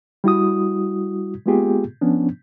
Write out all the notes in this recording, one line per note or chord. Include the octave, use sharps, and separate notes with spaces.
G3 E4 F#4 D#6
G#3 A#3 B3 F4 G4 G#4
F3 B3 C#4 D4